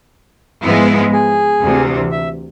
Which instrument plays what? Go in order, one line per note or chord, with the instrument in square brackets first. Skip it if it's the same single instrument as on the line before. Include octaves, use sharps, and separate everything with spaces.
[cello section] G#2 F3 G#3 B3 E4
[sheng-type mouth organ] G#4
[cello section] D2 C3 E3
[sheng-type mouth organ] E5